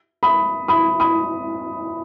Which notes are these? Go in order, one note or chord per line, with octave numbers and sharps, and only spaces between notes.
B5 D#6
B5 D#6
B5 D#6